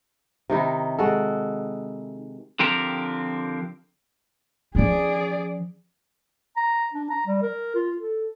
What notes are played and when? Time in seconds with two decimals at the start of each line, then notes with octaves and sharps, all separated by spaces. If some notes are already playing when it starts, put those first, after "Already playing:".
0.50 C3 D#3 D#4 E4
0.99 G#3 F#4 A4
2.59 D3 F3 C4 G4 A#4
4.75 F3 C#4 G#4 D5
6.57 A#5
6.94 D4
7.10 A#5
7.27 G3
7.42 A#4
7.75 F4
7.98 A4